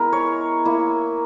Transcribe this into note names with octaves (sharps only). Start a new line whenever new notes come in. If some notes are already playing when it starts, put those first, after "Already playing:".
Already playing: G#3 B3 E4 A#4
C#5
A#3 E4